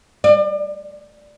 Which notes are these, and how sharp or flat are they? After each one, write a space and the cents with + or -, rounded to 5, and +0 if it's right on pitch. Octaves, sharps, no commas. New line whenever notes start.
D5 +35